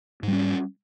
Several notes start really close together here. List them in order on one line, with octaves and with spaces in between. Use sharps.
G#2 G3 C#4